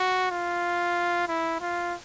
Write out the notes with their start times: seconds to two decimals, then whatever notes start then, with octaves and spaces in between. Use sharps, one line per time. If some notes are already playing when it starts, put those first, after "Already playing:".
Already playing: F#4
0.31 F4
1.28 E4
1.61 F4